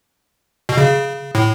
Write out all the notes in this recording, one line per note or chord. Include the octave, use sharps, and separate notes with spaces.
B2
C#3
A2